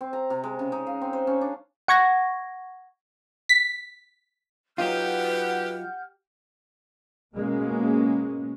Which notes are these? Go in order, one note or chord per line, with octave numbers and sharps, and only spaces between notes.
C4
A#5
C3
G#3
C#3
D#4
F5
C4
C5
C#4
D4
F#5 C#6 G#6 A#6
B6
F#3 D#4 F4 G4 B4 F#5 F6 G6
B2 G#3 A#3 C#4